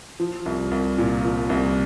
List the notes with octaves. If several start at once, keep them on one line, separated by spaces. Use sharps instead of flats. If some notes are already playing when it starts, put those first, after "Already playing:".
F3
C2
C2
A#2
F3
C2